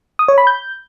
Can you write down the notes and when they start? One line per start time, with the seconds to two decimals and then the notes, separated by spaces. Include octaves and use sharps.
0.19 D#6
0.28 C#5
0.38 B5
0.47 G6